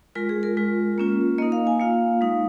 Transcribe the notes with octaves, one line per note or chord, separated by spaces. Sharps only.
G#3 F4 A#4
G#4
A#4
G#3 F4
A#3 C#4 F4
A#3 D#4 D#5
F5
G#5
A#3 F4 F5
G#3 D#4